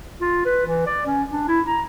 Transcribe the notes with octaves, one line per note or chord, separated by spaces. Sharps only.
F4
B4
E3
D5
C#4
D4
E4
A#5